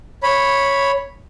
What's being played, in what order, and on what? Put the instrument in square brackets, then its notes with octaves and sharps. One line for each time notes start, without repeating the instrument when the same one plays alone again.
[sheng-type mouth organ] C#5 B5